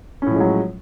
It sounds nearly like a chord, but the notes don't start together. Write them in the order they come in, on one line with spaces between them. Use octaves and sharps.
C#4 A2 F3 G#3 F#3